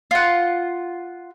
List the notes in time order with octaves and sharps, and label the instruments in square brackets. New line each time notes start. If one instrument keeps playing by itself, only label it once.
[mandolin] F4 F#5